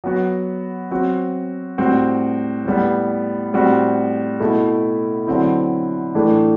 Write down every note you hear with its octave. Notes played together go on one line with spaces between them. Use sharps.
F#3 B3 F#4
F#3 C4 F#4
A2 G3 C4 F#4
A2 G3 B3
A2 G3 C4 F#4
B2 A3 E4
D3 F#3 C4 E4
A2 E3 A3 D4